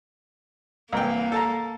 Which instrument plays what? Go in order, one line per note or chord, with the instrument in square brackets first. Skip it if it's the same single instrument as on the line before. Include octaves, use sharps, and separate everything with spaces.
[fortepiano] C2 E3 G5 [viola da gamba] A#3
[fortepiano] A4 A5 A#5